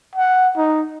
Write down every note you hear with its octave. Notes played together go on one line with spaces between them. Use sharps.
F#5
D#4